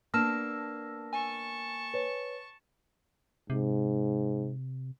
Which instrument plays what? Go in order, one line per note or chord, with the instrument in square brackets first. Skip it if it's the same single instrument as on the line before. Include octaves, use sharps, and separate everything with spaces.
[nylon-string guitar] A#3 B3 D4 [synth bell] A5 E6 A#6 [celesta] F6 E7
[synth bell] G#5 [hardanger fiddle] A5 C#6
[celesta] B4 C#5
[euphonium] G#2 [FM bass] C3